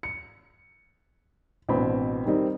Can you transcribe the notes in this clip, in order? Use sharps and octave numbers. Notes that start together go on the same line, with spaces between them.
C#7
A1 B2 C4 D4 B5 C6
D#3 G3 C4 D#4